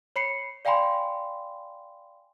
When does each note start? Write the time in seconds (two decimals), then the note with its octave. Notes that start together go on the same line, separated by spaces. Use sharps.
0.16 C#5 B5 C7 C#7
0.65 D5 F5 G5 G#5 B5 C6